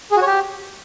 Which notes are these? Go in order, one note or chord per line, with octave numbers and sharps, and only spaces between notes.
G#4
F#4
C#5
G4